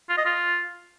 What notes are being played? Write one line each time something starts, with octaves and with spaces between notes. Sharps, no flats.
F4
D#5
F4